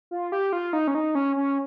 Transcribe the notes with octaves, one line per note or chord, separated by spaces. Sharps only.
F4
G4
F4
D#4
C#4
D#4
C#4
C#4